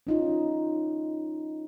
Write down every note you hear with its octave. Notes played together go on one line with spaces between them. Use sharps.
C#4 D#4 F4